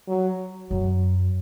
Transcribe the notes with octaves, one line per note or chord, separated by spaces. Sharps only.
F#3
F#2 F#3